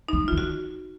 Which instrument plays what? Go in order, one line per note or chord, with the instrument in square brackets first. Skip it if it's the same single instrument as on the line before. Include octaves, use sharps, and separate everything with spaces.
[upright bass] G#3 [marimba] D#4
[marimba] F4
[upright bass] D#3
[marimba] F#4